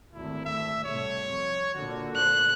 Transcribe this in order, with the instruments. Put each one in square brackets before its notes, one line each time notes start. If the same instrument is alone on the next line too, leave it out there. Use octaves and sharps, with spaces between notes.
[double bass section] G#1 D2 [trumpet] E4
[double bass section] D2 [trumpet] E5
[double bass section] C2 A2 [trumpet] C#5
[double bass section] F2
[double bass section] A#2 D3 [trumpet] F#4
[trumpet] C5 [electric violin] F#6